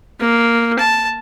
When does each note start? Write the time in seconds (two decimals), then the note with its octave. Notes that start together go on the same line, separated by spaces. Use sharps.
0.20 A#3
0.79 A5